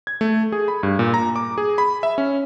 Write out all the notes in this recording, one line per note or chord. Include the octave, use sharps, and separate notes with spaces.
G#6
A3
G#4
B5
G2
A#2
A#5
D6
G#4
B5
E5
C#4